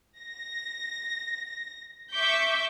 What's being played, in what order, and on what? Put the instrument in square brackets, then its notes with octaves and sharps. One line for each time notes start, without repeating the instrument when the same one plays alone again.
[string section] A#6
E5 C#6 D6 G6 B6